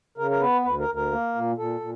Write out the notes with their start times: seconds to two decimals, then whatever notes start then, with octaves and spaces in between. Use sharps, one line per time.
0.18 C#3 A#4
0.31 A#4
0.41 B3 B4
0.64 D2 B4
0.80 A#4
0.88 D2
0.96 A#4
1.12 A#3
1.35 A#2
1.58 A#2 A4
1.81 A#2